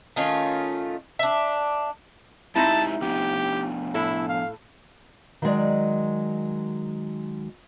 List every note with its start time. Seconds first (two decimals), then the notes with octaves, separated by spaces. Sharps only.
0.16 D#3 A3 C#4 F4
1.19 D4 E5
2.56 G#3 C4 D#4 E4 G4 E5 A5
3.02 F3 B3 D4 G4
3.94 A2 E4 A4
4.29 F5
5.42 D#3 F#3 G#3 D5